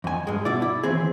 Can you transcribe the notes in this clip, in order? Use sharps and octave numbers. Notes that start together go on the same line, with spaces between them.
F2 G#5
G2 G#3
B2 E4 D5
E4
D#2 E3 C4 G#4